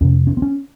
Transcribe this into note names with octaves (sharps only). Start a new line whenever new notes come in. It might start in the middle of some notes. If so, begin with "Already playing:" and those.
F2 C3 C#4
C#4
C4
C#4